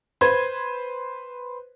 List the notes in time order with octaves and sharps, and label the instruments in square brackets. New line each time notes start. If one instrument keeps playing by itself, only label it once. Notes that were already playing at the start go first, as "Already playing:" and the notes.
[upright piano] B4 C5 C6 G#6